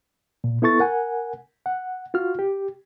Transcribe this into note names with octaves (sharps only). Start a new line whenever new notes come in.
A#2
B3 E4 A4 C#6 A6
A#4 F#5 G#5
F#5
F4 F#4 F6
G4